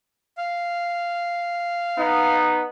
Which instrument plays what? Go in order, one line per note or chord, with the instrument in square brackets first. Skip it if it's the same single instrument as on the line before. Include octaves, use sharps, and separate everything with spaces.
[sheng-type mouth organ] F5
[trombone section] B3 D#4